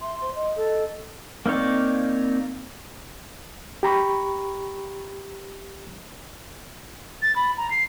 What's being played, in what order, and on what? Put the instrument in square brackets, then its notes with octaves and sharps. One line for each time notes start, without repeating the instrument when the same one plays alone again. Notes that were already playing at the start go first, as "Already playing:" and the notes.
[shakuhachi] E5 [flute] C6
[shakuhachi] C5
D#5
[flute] A4
[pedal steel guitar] A#3 C4 D#4 C#5 D5
[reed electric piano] G4 A#5 B5 C#6
[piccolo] A6
B5
A#5
C7